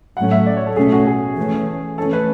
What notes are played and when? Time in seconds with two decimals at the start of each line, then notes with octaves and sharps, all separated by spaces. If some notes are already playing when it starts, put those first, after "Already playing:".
0.17 A2 F#3 A3 C#4 F#5
0.31 E5
0.47 D5
0.57 C#5
0.66 A4
0.76 B2 A3 C#4 G#4
0.92 F#4
1.07 G#4
1.37 E3 A3 C#4
1.98 E3 A3 C#4 A4
2.13 B4